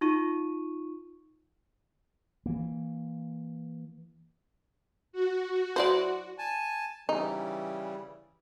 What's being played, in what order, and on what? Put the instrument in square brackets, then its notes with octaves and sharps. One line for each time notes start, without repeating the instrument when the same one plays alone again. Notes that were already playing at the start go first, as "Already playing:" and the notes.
[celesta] D#4 F4 C#6 D#7
[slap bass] E3 A#3
[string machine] F#4
[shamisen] F#3 E4 C5 [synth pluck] D5 F#5 C6
[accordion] G#5 A5
[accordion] C#3 E3 G3 [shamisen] D#4